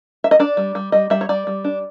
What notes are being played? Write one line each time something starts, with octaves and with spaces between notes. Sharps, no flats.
E5
D#5
D4 D5
G3
G3
G3 D#5
G3 E5
C#5
G3 D5
G3
D4